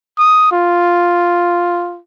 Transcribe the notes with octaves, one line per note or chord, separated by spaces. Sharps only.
D#6
F4